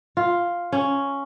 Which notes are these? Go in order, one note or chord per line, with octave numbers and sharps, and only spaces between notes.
F4
C#4